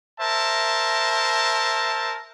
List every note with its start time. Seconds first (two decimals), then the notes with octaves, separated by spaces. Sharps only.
0.20 A#4 C5 E5 A5